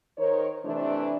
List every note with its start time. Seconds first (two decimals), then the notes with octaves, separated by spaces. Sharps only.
0.17 D#3 D#4 A#4 C5 C#5
0.65 C3 E3 A3 D4